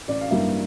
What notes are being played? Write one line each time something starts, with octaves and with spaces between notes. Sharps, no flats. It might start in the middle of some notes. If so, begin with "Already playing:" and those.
A1 D5
F5
G2 E3 G3 A#3 E5